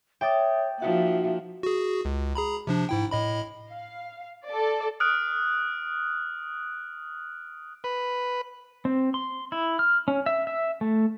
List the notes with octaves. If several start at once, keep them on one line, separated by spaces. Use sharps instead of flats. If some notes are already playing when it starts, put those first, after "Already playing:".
C#5 E5 G5 D6 D#6 A6
F3 A#3 D#4 F#4 E5 F#5
F#4 G#4
C#2
G#4 A#5 B5
C3 F3 D4
G#2 E4 G5
A2 D#5 B5
F5
A4 D5
D#6 F6 F#6 D7
B4
C4
C6
E4
F6
C#4
E5
E5
A3